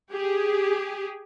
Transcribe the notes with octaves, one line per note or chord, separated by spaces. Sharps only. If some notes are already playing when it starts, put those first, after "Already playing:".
G4 G#4